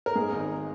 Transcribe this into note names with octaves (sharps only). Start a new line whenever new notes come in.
A#4
G#2 G#4
G#1